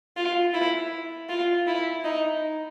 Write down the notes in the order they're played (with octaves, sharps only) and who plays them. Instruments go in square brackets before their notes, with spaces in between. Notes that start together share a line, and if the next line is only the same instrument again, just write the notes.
[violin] F4
E4
F4
E4
D#4